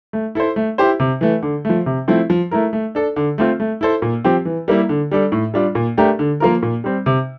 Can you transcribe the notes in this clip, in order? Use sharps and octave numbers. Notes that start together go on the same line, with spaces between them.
A3
E4 A4 C5
A3
E4 G4 C5
C3
E3 A3
D3
F3 A3
C3
F3 A3 C4 E4
F3
A3 E4 A#4
A3
D4 A4
D3
A3 C4 F4
A3
E4 A4 C5
A#2
F3 C4 G4
E3
G3 A#3 E4
D3
G3 D4 A4
A2
G3 D4 F4
A#2
A3 D4 G4 A#4
D3
F3 A#3 F4 A#4
A#2
G3 C4
C3